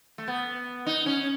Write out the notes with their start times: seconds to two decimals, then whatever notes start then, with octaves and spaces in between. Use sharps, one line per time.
0.18 A3
0.28 B3
0.86 D#4
1.06 C#4